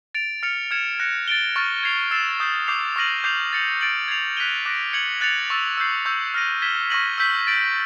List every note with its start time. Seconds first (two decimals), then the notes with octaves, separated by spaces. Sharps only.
0.15 A6 D7 F7
0.43 F6 A6 C#7 F7
0.71 F6 G#6 C#7 E7
1.00 F#6 A#6 C#7
1.28 A6 D7 G7
1.56 C#6 F6 A6
1.83 G#6 C7 F7
2.11 E6 A6 C7 E7
2.40 D#6 G6 C7
2.67 D6 G6 C7 F7
2.96 C#6 F6 A#6 D#7 F#7
3.24 D6 G6 C7 F7
3.53 A6 C#7 F#7
3.81 A6 D7 F#7
4.08 G#6 C7 F7
4.37 F#6 B6 D#7 G7
4.66 D6 F#6 A#6 D7
4.93 G#6 C#7 F#7
5.21 F#6 A6 C#7 F7
5.50 C#6 E6 A6
5.77 E6 G6 C7
6.06 C#6 E6 G6
6.34 F6 A#6 D#7
6.62 G#6 B6 E7 G7
6.90 C#6 F6 A#6 D#7 F#7
7.18 E6 G6 B6
7.47 A6 D7 F#7